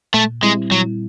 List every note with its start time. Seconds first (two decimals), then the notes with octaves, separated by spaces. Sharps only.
0.14 A#2 A3
0.43 G3 G#3 C4 E4
0.71 A#2 F#3